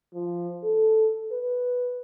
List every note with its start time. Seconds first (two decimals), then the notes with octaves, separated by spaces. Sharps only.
0.14 F3
0.64 A4
1.32 B4